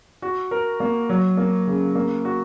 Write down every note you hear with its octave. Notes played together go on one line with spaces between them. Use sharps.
F#4
A#4
A#3
F#3
A#3
C#3
A#3
F#4